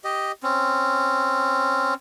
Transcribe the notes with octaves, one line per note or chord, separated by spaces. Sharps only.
G4 D#5
C4 C#4